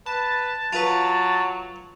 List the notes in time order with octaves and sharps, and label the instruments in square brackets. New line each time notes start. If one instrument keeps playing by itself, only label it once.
[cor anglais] B4 [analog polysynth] A5
[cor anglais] F#3 [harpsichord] F4 B4